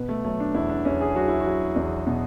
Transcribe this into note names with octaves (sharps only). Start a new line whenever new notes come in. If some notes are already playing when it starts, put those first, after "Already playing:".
Already playing: B2 B3
A3
F#3 A3
D4
E2 E4
D4
E2 C#4
G#4
F#3 F#4
E4
F#4
F#3
E2
B2